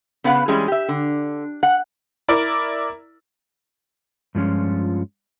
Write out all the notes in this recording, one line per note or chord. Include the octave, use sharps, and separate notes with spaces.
C#3 B3 B4 F5 F#5
E3 G3 G#3 C#4 G#4
G4 E5
D3
F#5
E4 A#4 D5
G2 F3 G#3 C#4 F4